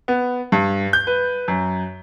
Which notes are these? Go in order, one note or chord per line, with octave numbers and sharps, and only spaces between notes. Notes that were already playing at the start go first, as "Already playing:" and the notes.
B3
G2
G6
B4
F#2